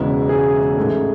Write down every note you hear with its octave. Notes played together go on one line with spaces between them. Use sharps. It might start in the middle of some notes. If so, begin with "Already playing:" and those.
Already playing: E1 E2 C#3 G#3 B3 E4
G#4
A1 G#2 D#3 A3